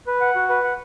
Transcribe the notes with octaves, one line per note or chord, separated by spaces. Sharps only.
B4
F#5
F#4
B4
F#5